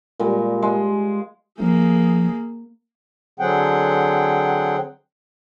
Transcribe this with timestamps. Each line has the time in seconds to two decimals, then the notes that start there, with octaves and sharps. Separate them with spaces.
0.20 A#2 G3 G#3
0.62 G#3
1.60 F3 A#3 G#4
3.40 D3 F#3 C4 G#4 F#5 G5